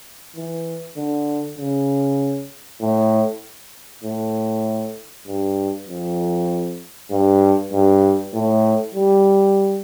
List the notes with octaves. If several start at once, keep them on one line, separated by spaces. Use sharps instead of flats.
E3
D3
C#3
A2
A2
G2
F2
G2
G2
A2
G3